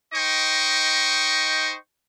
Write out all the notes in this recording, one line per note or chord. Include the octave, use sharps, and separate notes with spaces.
D#4 C5 D#5 G5 C#6